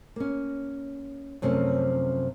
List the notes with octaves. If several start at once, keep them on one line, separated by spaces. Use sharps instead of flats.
A#3 C#4
F#2 C3 F3 A3 C#4